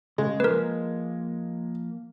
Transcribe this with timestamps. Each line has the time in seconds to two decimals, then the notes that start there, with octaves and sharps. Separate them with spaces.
0.18 C#3 G#3
0.40 F3 A#3 A#4 B4